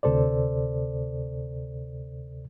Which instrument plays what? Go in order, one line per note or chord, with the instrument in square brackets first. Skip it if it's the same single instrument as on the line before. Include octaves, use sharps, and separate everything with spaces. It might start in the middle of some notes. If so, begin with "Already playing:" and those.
[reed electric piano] D2 C3 A4 C5 D5